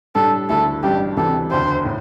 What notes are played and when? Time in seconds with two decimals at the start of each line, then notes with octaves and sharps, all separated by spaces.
0.15 A2 G3 D4 G4 A4
0.49 D2 D3 A3 E4 A4
0.83 A1 G2 G3 D4 G4
1.17 D2 C3 E3 G3 A4
1.51 E1 D2 D3 C5
1.85 A2